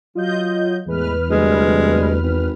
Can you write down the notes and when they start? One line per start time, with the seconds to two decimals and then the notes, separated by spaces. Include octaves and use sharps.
0.15 F#3 F4 D#5 G6
0.86 E2 A2 E3 G#3 B4 F6
1.30 D2 C3 G3 G#3
2.22 G#1